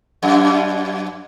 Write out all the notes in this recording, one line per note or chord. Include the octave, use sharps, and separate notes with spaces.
F#2